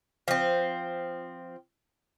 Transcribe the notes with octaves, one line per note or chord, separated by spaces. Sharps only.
F3 C4